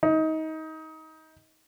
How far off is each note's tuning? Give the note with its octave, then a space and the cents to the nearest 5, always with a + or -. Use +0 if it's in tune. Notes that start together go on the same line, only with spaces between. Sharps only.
D#4 +25